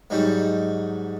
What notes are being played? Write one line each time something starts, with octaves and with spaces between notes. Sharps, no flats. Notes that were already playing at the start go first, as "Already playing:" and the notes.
G#2 F#3 G3 D#4